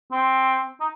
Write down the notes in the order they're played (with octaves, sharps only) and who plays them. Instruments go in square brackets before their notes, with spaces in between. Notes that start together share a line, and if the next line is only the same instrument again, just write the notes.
[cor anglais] C4
D#4